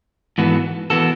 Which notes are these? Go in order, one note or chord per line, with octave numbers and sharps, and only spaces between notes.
G#2 E3 B3 F#4 A4
E3 B3 F#4 A4